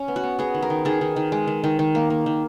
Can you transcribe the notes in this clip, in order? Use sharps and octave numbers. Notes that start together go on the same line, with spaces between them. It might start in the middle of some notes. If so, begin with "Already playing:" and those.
Already playing: C#4
B3
F#4
B3
B3 G#4
D#3
A#4
D#3
D#3 G#4
D#3
D#3
G#3
D#3
D#3
D#3
A#3
A#3
D#3